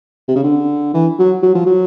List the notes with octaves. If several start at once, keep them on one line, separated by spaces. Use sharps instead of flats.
C3
C#3
D3
E3
F#3
F#3
F3
F#3